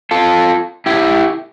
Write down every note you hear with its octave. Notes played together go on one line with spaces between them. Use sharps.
F4 A4
E4 G4